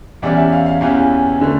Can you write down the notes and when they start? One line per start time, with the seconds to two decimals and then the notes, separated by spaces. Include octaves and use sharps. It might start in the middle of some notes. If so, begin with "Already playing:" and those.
0.22 E2 E3 G3 C#4 D5
0.37 E5
0.52 F5
0.66 F5
0.81 E2 E3 G3 C#4 F5
1.41 D3 A3